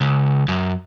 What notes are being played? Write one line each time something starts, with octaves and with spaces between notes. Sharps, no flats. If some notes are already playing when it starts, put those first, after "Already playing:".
C#2
F#2